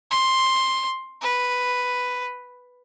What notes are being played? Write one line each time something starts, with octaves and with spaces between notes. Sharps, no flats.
C6
B4